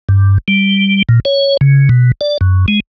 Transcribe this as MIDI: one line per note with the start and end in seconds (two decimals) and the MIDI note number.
0.09 0.38 43
0.48 1.02 55
1.09 1.20 46
1.25 1.57 73
1.61 1.89 49
1.89 2.12 47
2.21 2.38 74
2.41 2.66 42
2.68 2.80 56